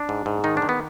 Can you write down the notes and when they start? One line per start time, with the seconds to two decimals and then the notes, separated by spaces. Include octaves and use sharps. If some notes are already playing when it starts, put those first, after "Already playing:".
Already playing: D4
0.09 G#2
0.26 G#2
0.44 D#3 D#4
0.57 D4
0.62 D#3
0.69 B3